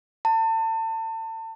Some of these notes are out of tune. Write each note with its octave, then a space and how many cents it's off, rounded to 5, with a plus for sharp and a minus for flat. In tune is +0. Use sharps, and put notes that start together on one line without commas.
A5 +35